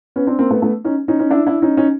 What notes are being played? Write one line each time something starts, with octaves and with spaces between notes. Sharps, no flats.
B3 C#4
C4 D4
A#3 C4
A3 B3
A3 B3
C#4 D#4
C#4 D#4
C#4 D#4
D4 E4
D4 E4
C#4 D#4
C#4 D#4